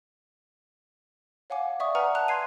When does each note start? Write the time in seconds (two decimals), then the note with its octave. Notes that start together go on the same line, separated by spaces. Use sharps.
1.50 C#5 F5 F#5 G#5 D6
1.79 D5 E5 C#6 D#6
1.95 B4 D5 F#5 G#5 A#5 F6
2.14 E5 F#5 A5 F#6 F7
2.28 G#5 C6 G#6 C7 D#7